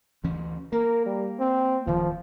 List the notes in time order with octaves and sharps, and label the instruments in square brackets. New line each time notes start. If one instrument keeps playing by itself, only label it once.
[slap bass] D2 E3 C#4
[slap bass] A#3 [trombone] A#4
[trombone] G3
C4
[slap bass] D1 D#3 [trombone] F3